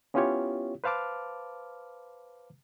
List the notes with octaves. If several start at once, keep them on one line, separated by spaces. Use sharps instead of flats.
B3 C#4 E4 F4 G4 C#5
B4 C5 F5 A5 D6 F6